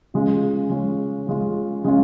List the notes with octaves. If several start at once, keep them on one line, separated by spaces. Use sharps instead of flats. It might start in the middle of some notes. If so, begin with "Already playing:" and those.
C#3 G#3 C#4 F4
C#3 G#3 C#4 F4
C#3 G#3 C#4 F4
C#3 G#3 C#4 F4